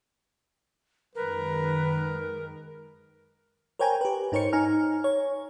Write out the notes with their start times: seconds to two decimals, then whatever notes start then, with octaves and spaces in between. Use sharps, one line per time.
1.15 F#2 D#3 G#3 A#4 B4
3.79 A#4 C5 C#5 G5 G#5 A#5
4.01 G4 B4
4.32 G#2 D#4 A#4 C5 C#5 C#7
4.53 D#4 G#5 A#5 F6
5.04 C#5